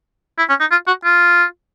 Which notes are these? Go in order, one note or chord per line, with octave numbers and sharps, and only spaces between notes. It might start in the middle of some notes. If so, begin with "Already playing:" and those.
E4
C#4
D#4
F4
F#4
F4